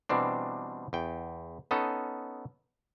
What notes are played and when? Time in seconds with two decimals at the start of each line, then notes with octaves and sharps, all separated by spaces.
0.09 B2 E3 G3 C4 D4
0.93 E2 G5
1.71 B3 C#4 D#4 A4